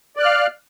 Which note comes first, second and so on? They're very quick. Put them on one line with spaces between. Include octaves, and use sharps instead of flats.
D5 F#6 F6 F5